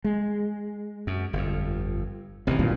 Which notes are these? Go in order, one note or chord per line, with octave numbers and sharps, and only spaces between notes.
G#3
F#2
G1 F2
A1 C3 D#3 E3
B1 G2 A#2